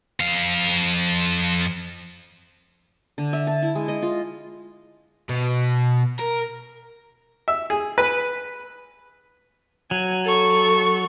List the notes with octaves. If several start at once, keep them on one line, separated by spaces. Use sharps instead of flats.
F2 F5
D3
E5
A5
E4
G#3
D#5
F4
B2
A#4
E5
G#4
B4
F#3 G#5
A4 C#6